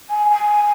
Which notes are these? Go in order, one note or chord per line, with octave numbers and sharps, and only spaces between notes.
G#5
G#5